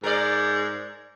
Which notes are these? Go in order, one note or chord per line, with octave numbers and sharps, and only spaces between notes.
G#2 A#4 D5